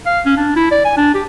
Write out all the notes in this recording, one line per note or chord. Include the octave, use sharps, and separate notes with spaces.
F5
C#4
D4
E4
D5
G#5
D4
G4